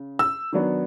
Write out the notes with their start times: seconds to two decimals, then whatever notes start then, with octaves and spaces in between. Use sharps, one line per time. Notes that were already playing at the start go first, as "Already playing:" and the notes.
Already playing: C#3
0.19 E6
0.53 D#3 F#3 B3 D4